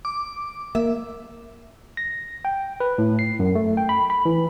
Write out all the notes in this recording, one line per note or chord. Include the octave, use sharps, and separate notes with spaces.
D6
A#3 E5
A#6
G5
B4
A2
C7
F#2
A3
G5
B5
B5
E3